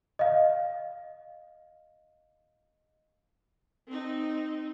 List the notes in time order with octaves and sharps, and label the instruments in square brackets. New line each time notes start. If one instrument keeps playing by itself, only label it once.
[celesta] D#5 F5
[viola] C4 D#4